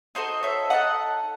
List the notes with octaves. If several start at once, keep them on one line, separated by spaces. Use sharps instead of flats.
D#4 F#4 A4 C5 D#5
C#5 E5
D#4 F#4 A4 D#5 F#5